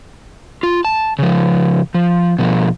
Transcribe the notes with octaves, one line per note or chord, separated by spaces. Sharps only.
F4
A5
C#3 F3
F3
B2 F3